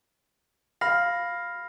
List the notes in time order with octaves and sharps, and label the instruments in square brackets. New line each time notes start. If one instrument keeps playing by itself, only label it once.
[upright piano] F5 [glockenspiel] B5 F6 A#6